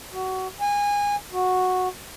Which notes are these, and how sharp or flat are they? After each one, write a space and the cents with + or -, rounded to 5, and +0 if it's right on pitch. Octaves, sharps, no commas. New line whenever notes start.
F#4 +25
G#5 -25
F#4 -5